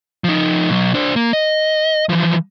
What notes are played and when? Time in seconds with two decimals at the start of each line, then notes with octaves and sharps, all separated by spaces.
0.24 F3 D#4
0.70 B2 F#3
0.94 D4 C5
1.16 A#3
1.33 D#5
2.09 E3 F3